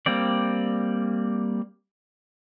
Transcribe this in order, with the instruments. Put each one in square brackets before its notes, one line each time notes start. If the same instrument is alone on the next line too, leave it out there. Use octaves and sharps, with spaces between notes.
[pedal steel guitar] G3 A#3 C4 D5